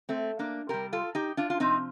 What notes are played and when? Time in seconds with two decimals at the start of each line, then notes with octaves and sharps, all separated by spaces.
0.09 A3 C4
0.39 A#3 D4
0.69 C3 G3 G4 A#4
0.93 F4 A4
1.15 D#4 G4
1.37 D4 F4
1.50 F4
1.60 C3 F3 C4 D#4